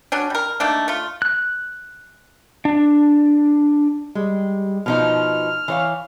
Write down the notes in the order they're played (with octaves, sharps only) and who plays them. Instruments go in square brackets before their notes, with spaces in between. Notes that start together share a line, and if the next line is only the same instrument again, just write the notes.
[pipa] F#3 C#4 D4
G3 A#4
D#3 A3 A#3 D4
A3 F4
[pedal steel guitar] F#6
D4
[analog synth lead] G3 [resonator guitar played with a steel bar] G#3
[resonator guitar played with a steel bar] B2 F3 D#4 [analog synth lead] F6
[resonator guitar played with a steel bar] E3 C#5 F5